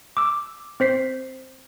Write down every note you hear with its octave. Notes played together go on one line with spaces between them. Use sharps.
D6 E6
C4 C5 B6 C7